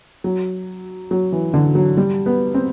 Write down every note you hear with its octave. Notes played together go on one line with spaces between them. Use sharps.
F#3
F#3
E3
D3
F#3
G3
B3
C4